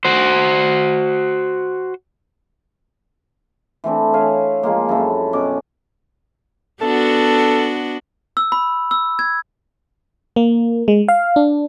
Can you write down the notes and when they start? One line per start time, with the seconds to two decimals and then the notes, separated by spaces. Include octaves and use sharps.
0.05 F#4 C5
3.84 E3 A3 C4 D4
4.13 C#5 E5 F5 G#5
4.63 F3 G#3 A#3
4.89 F#2 E4 A4 G5
5.33 B2 C#4 D6
6.81 B3 D4 F#4 A4
8.37 E6
8.52 B5
8.91 E6
9.19 G#6
10.36 A#3
10.88 G#3
11.08 F5
11.36 D4